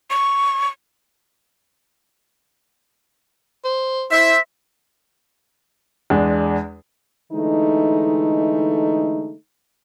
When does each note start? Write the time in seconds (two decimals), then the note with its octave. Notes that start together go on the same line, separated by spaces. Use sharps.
0.10 C#6
3.65 C5
4.11 E4 C5 E5 B6
6.10 E2 G#3 D4
7.32 D3 E3 G#3 A3 D#4